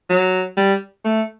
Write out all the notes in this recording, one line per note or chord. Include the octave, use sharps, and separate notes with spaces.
F#3
G3
A3